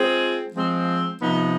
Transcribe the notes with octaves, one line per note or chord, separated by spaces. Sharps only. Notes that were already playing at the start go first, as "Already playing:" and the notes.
Already playing: G#3 C4 F4 G#4
F3 G#3 C4
C3 F3 B3 D#4